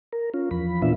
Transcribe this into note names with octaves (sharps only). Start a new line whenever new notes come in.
A#4
C#4 F4
E2 F3 B5
A#2 E3 B3 D4 F4 E5